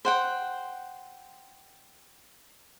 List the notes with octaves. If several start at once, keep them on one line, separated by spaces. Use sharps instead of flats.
C5 F#5 G5